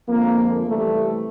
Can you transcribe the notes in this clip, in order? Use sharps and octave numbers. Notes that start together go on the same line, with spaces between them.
F2 D3 F3 G#3 A#3
C3 E3 G3 A3